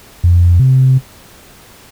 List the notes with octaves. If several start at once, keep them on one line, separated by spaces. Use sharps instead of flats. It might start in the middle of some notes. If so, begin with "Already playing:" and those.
F2
C3